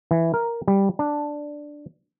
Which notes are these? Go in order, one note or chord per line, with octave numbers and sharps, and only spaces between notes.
E3
A#4
G3
D4